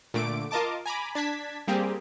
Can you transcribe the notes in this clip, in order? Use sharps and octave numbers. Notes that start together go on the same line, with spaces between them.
A#2 D3 A3 D6 D7
F4 A#4 D#5 A5 D6
G#5 A#5 B5 D6
D4 A5 G#6 B6
G3 A#3 C4 G4 G#4